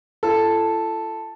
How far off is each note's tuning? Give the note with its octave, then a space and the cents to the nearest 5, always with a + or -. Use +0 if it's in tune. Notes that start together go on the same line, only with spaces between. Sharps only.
F4 -45 A4 +0